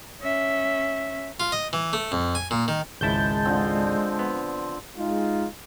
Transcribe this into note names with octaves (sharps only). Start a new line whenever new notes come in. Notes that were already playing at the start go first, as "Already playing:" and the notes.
C#4 E5
F4
D#5
E3
A3
F2
G#5
A#2
D#3
G#1 C#2 G#3 E4 A5 G6
D3 F3 C4
B3
G#3 D#4 F4